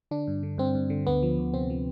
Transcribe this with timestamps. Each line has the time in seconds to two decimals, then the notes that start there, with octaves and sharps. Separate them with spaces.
0.11 D3 D4
0.27 G2
0.43 D3
0.58 G2 C4
0.75 G2
0.90 D3
1.07 D2 B3
1.23 F3
1.39 D2
1.54 C3 C4
1.70 F3